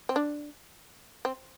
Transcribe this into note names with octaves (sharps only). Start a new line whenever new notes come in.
C4
D4
C4